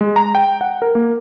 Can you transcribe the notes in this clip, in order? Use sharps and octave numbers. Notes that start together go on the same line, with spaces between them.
G#3
A#5
G5
F#5
A#4
A#3